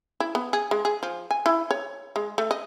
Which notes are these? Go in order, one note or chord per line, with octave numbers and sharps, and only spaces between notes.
E4
B3
G#4
G#3
G#4
F3
G#5
E4
C#5
G#3
A3
D#5